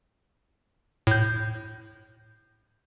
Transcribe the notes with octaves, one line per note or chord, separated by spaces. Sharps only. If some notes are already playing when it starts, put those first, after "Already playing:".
A2 G6